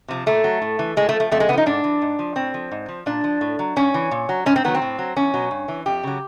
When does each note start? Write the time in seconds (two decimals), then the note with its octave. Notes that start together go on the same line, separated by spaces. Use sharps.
0.08 C3 F3
0.26 A#2 A3
0.44 F#3
0.62 A2
0.79 E3
0.97 A2 G#3
1.09 A3
1.13 F3
1.20 A3
1.31 F2 A3
1.40 G#3
1.49 D3 B3
1.53 F3 D#4
1.66 G#2 D4
1.84 E3
2.02 G#2
2.19 F3
2.36 A2 C4
2.54 F3
2.72 G#2
2.88 F3
3.06 A#2 D4
3.24 F3
3.41 A2
3.59 F#3
3.76 G2 C#4
3.94 E3
4.11 A#2
4.29 F#3
4.46 G#2 C#4
4.56 C4
4.64 D#3 F#3 B3
4.75 C4
4.82 A2
4.99 F#3
5.16 E2 C#4
5.34 B2 F#3
5.51 G2
5.68 E3
5.86 F2 G4
6.03 C#3 F#3